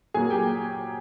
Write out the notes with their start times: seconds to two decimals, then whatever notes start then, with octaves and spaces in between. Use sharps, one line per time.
0.14 A#2 F#3 A#3 G#4 G#5
0.30 G4 G5